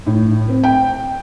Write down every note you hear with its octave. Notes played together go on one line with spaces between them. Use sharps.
A2
C4
G5